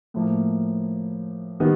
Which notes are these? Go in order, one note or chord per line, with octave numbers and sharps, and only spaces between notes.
A2 F3 A#3
D#3 G3 B3